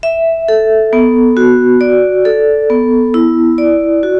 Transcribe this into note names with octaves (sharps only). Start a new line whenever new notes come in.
E5
A4
B3
F#4
D5
A4
B3
E4
D5
F#4